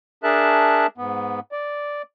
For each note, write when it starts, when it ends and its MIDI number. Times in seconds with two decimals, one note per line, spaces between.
0.23 0.87 62
0.23 0.87 68
0.23 0.87 70
0.23 0.87 76
0.23 0.87 81
0.23 0.87 90
0.98 1.40 44
0.98 1.40 59
1.52 2.02 74